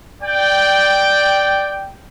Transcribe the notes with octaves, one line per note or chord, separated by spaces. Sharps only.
D5 G5